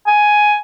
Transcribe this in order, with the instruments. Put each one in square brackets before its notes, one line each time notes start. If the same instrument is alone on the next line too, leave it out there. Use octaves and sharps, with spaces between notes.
[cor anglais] G#5